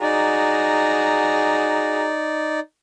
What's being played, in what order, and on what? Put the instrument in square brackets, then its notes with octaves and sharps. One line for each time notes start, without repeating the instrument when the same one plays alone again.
[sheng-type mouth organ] D#4 D5 [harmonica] F#4 G#4 A#5